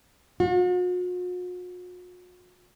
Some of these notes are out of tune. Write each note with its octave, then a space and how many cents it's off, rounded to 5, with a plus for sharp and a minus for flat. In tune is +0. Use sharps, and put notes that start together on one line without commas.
F#4 -45